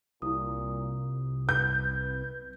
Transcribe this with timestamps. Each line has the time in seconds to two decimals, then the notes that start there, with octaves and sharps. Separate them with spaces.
0.22 C2 A#2 E4 D#6
1.49 B4 G6